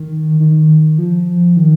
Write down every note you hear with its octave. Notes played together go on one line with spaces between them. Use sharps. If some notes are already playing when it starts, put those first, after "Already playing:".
Already playing: D#3
D#3
F3
D#3